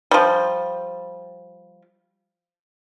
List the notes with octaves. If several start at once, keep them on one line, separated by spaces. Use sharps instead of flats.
F3 G3